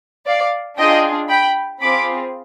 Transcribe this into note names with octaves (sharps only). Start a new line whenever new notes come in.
D5 F5
D4 F4 G#4 D#5 G5
G5 B5
C4 F4 G#4 B5 D6